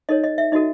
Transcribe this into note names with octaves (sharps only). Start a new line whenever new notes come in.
D#4 A4 C#5 D#5
D#5
E5
D#4 F#4 A4 D#5